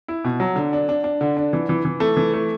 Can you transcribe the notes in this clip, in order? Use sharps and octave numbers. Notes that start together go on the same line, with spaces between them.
E4
B2
F#3
D3
D4
D4
D4
D3
D4
E3
E3
E3
A3
E3
A3